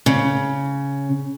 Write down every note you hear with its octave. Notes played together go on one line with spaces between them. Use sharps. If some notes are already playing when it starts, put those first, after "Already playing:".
C#3